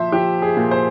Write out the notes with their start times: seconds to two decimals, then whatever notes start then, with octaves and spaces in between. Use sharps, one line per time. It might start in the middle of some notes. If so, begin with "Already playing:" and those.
Already playing: A#2 F3 C5 E5
0.12 F3 G4
0.42 G#4
0.57 A#2
0.71 C5